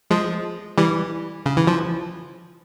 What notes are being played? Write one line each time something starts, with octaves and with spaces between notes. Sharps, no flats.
F3 G#3
E3 G3
C#3
E3
F3